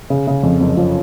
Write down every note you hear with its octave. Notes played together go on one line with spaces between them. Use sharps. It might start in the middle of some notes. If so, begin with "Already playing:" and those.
C#3
C#3
F2
F#1
F3